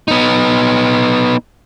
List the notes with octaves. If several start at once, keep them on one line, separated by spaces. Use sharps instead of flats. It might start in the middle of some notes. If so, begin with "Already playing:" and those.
B3 D#4